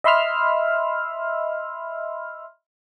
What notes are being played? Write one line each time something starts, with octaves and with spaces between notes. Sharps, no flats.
D#5 E5 B5 C6 E6 F6